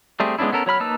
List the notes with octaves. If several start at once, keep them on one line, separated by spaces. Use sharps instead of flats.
G3 A3 C4 G#4
G#3 B3 C#4 D4 E4
B3 C#4 A4 A#4
F#3 C#5 B5 F6
A#3 D#4 B4 A5 E6